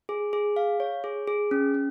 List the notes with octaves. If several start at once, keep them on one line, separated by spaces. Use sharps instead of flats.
G#4
G#4
F5
C#5
G#4
G#4
C#4
C#4